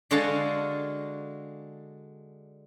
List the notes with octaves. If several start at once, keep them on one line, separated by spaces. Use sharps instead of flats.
D3 G#3 D4 F#4 F5 A5